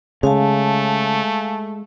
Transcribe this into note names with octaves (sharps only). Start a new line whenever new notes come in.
C#3 G#3 A3 F5 G#5 A5